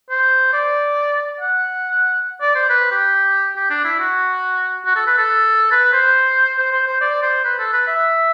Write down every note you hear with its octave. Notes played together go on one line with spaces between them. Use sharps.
C5
D5
F#5
D5
C5
B4
G4
G4
D4
E4
F#4
F#4
A4
B4
A4
B4
C5
C5
C5
C5
D5
C5
B4
A4
B4
E5